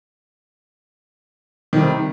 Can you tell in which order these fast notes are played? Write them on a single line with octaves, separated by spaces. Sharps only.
D#3 G3 C3